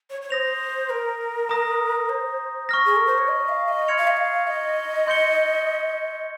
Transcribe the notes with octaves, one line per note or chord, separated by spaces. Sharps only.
C#5
C#5
C5 D#6 A#6 F7
A#4
A#5 D#6 A#6
C5
C#6 F6 A#6
G#4
A#4
C5
C#5
D#5
F5
D#5
C6 F6 G#6 C#7 F7
F5
D#5
F5
D#5
C6 G6 C#7 G7